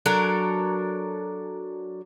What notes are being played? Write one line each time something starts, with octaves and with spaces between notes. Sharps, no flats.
F#3 D4 A4 A#4